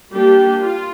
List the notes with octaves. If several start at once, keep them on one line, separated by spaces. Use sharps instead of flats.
G3 A#3 D4 G4
F4